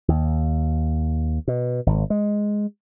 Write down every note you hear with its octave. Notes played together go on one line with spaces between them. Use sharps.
D#2
B2
G#1
G#3